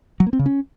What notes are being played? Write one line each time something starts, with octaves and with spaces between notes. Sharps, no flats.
F#3
A#3
C4
C#3
C#4